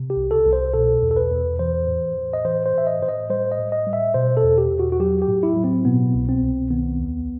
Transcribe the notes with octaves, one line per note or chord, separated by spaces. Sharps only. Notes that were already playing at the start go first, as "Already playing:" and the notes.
Already playing: C3
G4
C2
A4
C2
C5
B2 A4
E2
A4
B4
E2
E3 C5
A2
A2
D#5
E3 C5
C5
A2 E5
D#5
A2 C5
D#5
G3 C5
D#5
A2
D#5
G3
E5
B2 C5
A4
E2
G4
E2
F#4
F#4
F#3 G4
G4
A2
E4
F#3
C4
B2 B3
C2
C4
C2
D#3 B3
D#2